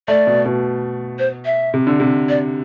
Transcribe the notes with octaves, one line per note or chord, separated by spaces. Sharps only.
A3 D5
B2
B2
C5
E5
C3
D3
C3
D5